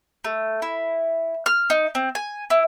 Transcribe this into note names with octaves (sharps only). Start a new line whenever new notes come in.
A3
E4
F6
D#4
C4
G#5
E4